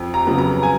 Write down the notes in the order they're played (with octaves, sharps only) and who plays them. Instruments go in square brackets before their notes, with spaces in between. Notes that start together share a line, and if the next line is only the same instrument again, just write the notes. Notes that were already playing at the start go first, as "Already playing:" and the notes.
Already playing: [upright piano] F2
A#5
C#3 F#3 B3
A#5
G#5